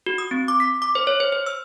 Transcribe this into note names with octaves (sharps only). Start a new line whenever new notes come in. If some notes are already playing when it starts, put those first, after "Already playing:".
F#4
D#6
C4
D6
B6
D6
C5
C#5
C5
C5
E6